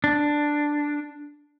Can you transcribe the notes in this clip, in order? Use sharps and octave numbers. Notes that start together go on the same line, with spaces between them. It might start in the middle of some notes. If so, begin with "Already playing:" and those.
D4